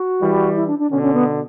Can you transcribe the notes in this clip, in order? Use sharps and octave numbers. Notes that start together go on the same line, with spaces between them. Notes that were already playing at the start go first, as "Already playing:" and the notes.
Already playing: F#4
E3 G3
E4
D4
D4
B2 D3 C#4
C#4
B3